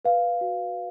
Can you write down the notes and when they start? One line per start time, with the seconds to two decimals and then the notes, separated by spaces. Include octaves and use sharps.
0.05 B4 F5
0.41 F#4